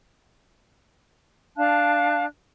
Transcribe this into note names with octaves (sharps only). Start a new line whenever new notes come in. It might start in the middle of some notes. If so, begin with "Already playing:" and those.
D4 F5 A5 F#6